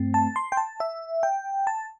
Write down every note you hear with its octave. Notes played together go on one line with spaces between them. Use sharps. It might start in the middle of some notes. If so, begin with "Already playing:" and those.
Already playing: G2 A3 C4
A5
C6
G5
A5
E5
G5
A5